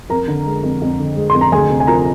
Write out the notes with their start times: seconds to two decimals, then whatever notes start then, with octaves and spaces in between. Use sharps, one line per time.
0.10 F2 A#4 A#5
0.28 D3
0.46 G#3
0.63 F2
0.82 F2
0.99 D3
1.16 G#3
1.30 F2 C6
1.41 A#5
1.52 D2 G#4 G#5
1.70 C3
1.80 G#5
1.87 F3 A#4 A#5